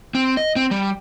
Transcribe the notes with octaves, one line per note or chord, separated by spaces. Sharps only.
C4
D#5
C4
G3